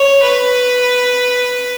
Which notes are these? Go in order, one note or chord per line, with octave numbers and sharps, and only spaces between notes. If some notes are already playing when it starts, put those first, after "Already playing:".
Already playing: C#5
B4